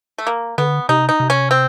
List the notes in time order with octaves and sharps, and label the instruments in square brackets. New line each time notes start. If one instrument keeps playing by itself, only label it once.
[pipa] A3
A#3
[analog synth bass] D3 [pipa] B3
[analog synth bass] C3 [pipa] D#4
[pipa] D#4
[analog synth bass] C3
[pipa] C#4
C4